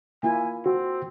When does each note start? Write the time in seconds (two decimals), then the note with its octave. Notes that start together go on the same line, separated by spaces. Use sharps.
0.23 A#3 E4 F4 G#5
0.66 C4 F#4